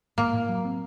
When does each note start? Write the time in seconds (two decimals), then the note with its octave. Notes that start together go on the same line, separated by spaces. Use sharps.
0.18 A2 A#3
0.34 A2
0.49 F#3
0.65 C4